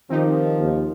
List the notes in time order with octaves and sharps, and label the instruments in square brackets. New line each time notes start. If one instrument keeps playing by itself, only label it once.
[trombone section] D#3 [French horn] F3 [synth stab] C4 D#4 G4
[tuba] D#2